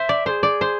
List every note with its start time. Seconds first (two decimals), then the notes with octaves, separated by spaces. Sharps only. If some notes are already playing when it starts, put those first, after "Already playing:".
Already playing: C5 E5
0.09 D5
0.26 A4 C5
0.30 G#4
0.43 D5
0.61 C5